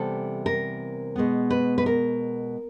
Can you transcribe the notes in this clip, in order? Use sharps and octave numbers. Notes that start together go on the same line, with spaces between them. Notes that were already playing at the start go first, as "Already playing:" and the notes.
Already playing: C3 E3 G3 B3 A4
A#4
B2 G#3 B3
B4
B4
A#4